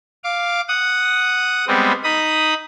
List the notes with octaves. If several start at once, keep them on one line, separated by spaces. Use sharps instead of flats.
F5 D6
F#5 D#6
G3 G#3 B3 C4 G4
D#4 B5 D#6